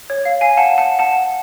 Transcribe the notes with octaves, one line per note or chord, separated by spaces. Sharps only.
C#5
F5
F5 G#5
F#5 A5
F#5 A5
F#5 A5